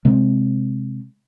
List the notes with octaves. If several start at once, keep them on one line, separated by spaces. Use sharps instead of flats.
C3 G#3 C4